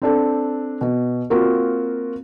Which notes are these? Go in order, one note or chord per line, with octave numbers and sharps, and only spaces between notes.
C4 D4 A4
B2
A#3 C4 F4 F#4 A#4